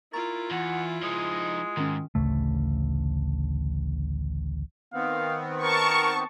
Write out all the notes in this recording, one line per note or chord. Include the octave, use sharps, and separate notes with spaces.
E4 F4 A#4 A#5 C#6 A6
E2 F#5
F3 G#3 D#4
G#2 D#3 C#4
A1 D2 C#3 A3
D#3 B3 C4 F5
A#4 A5 C#6